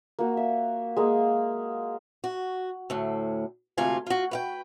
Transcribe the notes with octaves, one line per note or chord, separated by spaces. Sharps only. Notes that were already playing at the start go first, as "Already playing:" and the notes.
A#3 F#4
E5
G#3 A#3
F#4
D2 A2
D2 G#2 C3 F4 G#5
F4 F#4
B4 F5 G5